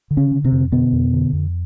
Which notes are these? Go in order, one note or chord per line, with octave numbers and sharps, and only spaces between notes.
D3
C#3 C#4
D3
C3 C4
F2
B2 D3 B3
F2
D3
F2